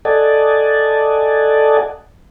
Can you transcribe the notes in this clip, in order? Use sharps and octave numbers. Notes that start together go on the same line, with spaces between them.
A4 D5 D#5 F#5 G#5 A5